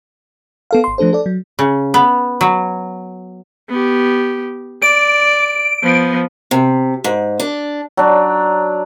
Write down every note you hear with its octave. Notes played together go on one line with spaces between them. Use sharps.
B3 A4 F5
G#1 C6
F3 A3 D4 A4 C5
A4 D5
F#3
C#3
B3
F#3
B3 G4
D5 D7
F3 B3
C3
G#2
D4
F#3 D4